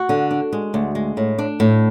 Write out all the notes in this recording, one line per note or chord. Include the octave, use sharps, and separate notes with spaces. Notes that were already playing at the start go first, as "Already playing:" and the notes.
Already playing: F#4
D3
D4
G#3
D2
G#3
A2
D4
A2